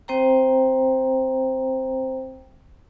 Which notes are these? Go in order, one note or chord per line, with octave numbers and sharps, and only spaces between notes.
C4 C5 G5 A#5